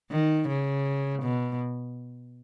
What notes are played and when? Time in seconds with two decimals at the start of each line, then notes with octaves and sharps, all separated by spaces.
0.11 D#3
0.48 C#3
1.22 B2